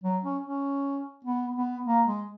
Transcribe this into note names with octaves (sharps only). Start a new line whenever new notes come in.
F#3
C#4
C#4
B3
B3
A#3
G#3